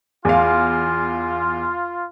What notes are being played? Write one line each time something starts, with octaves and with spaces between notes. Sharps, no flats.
E2 F4 F5